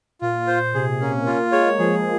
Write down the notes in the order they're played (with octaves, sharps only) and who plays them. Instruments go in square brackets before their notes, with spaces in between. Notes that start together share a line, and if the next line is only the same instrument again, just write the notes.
[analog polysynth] A#2 [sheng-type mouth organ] F4
[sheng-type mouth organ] C5
[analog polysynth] C3 [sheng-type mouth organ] G#4
[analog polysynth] A#3 [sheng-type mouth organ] C#4
[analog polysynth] A#3 [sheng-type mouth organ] F4
[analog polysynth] G#3 [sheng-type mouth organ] C#5
[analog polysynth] F3 [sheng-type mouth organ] G#4